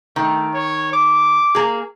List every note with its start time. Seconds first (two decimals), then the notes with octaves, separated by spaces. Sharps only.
0.16 D#3 A3
0.54 C#5
0.93 D6
1.55 A#3 G#4